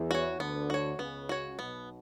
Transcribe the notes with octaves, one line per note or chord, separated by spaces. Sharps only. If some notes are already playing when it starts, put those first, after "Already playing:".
Already playing: E2 E3
F#4 C#5
D2 D3 B3
F#4 C#5
C#2 C#3 B3
F#4 C#5
B1 B2 B3